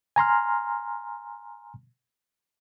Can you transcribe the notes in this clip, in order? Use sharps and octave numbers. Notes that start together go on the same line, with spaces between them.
G#5 A#5 C6 F6